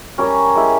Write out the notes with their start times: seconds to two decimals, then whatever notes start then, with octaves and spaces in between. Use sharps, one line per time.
0.18 G3 C#4 G4 A#4
0.55 G#3 E4 G4